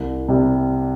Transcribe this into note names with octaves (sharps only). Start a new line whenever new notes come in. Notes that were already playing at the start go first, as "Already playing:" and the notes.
Already playing: C2
C3 G3